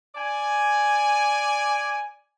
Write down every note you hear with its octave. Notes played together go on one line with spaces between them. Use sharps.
D5 G#5